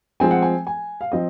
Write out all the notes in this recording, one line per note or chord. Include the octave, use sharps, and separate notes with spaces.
F3 G#3 C4 G#5
F#5
G#5
G#5
F5
F3 C4 D#5